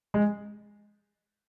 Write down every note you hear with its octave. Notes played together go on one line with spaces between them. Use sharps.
G#3